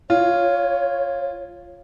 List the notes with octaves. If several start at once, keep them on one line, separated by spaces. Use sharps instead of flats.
F4 C#5